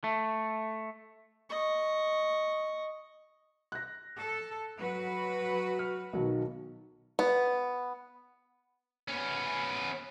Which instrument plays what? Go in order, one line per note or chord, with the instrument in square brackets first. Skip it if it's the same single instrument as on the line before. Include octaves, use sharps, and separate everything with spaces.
[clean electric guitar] A3
[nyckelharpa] D#5 C#6
[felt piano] F#6 A#6
[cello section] A4
F#3 F#4 B4
[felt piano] F6
B1 D#3 F#3
[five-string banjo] B3
[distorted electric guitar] B3 C#4